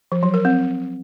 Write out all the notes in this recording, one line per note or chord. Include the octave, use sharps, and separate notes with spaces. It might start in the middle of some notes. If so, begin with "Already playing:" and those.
F3
F#3
A#4
C4